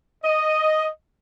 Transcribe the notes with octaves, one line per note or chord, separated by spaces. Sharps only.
D#5